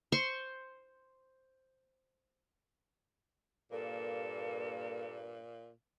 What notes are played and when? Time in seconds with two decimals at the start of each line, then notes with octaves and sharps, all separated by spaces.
0.12 C5 C6 C#6
3.72 G2 A#2 A#3 A4